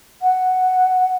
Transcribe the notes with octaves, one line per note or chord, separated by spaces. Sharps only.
F#5